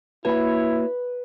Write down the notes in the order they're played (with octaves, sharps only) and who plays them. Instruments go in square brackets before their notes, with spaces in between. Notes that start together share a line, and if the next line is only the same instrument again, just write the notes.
[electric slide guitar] A#3 F#4 C#5 [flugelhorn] E4 [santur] B4 B5